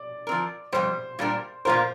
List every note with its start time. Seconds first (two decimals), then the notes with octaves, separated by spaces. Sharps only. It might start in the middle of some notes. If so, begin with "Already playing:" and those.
Already playing: D5
0.27 F3 C4 A#4
0.72 F2 C3 G3 C5
1.19 A#2 G3 D4 A#4
1.65 A#2 A#3 F4 A#4 C5